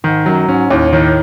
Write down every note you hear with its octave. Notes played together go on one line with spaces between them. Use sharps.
G#2 D#3
F#2 F#3
G#2 C#4
D#2 A2
A2 D#3